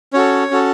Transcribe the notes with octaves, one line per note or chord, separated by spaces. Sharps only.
C#4 F#4 A4 C#5
C#4 F#4 A4